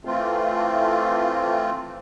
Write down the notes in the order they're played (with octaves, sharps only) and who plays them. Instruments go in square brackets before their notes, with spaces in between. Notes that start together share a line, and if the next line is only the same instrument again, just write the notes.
[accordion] E3 A3 C4 F4